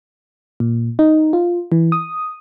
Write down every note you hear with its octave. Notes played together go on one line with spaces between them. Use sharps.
A#2
D#4
F4
E3
D#6